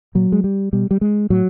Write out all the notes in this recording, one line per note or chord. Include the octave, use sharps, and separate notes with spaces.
A#2 F#3
G#3
G3
B2 G3
G3
G#3
A2 F#3